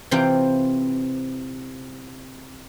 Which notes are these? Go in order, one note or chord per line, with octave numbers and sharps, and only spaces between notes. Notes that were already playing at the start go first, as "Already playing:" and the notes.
C3 E3 C4 F4 C5 G5